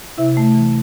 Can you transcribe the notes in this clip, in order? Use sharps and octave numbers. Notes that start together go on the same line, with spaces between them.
C3 E4 E5
A3
E3